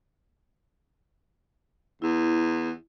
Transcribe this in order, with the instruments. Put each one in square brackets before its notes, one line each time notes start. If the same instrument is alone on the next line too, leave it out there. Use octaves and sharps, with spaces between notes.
[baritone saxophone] E2 [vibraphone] E4